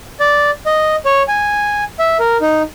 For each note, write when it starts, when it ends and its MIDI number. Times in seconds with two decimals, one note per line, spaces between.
0.20 0.50 74
0.66 0.96 75
1.06 1.23 73
1.28 1.84 80
1.99 2.17 76
2.20 2.37 70
2.41 2.62 63